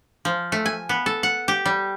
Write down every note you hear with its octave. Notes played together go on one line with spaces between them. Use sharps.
F3
A3
G#5
B3
A4
F#5
G4
G3